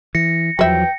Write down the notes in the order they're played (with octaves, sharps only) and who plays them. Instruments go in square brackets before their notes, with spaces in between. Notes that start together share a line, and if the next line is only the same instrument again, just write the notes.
[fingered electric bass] E3 [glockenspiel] A#6 C#7
[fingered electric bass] E2 F3 F#3 [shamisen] B4 E5 [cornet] G5